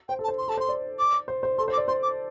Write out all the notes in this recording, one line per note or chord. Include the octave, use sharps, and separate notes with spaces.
C5 G5
A4
A5
C5
C6
A4 A5
C5 C6
D5
D6
C5
C5
A4 C6
C5
D6
D5
C5 C6
D6